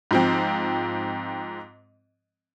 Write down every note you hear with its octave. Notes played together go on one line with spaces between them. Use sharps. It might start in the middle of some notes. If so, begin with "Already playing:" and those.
G#2 F3 C4